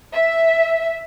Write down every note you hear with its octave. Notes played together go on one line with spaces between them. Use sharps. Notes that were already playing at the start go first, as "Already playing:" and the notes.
E5